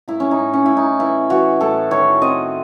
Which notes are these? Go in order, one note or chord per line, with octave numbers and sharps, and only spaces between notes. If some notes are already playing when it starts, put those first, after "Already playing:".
A2 E4
C#4
D#4
A2
C#4
A2 E4
D#4
E3 E4
E3 F#4
A2 A4
D#3 C#5
C4 D#5